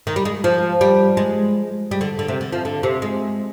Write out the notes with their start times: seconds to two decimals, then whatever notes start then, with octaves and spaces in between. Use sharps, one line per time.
0.07 D#3
0.16 G3
0.25 G#3
0.44 F3
0.81 G3
1.17 G#3
1.91 G3
2.01 D3
2.19 D3
2.28 C3
2.41 D3
2.53 F3
2.65 D3
2.83 C3
3.02 G#3